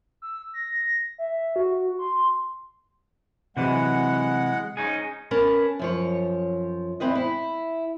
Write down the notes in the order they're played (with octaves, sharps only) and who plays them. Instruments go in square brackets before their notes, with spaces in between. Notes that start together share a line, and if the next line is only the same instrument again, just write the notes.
[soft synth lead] E6
A#6
E5
F#4
C6
[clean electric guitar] C3 E3 F#3 [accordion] G#3 F#5
[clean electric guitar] C#4 D#4 G#4
[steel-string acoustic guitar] C#4 A#4 B4 A5
F#2 F3 C#5
E2 C4 B4 D#5
E4